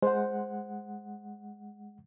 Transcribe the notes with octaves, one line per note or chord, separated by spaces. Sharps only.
G#3 C5 F#5